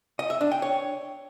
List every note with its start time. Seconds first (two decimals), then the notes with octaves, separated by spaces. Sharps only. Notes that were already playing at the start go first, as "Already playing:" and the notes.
0.19 D#5
0.30 E5
0.41 D4
0.51 G5
0.62 C#5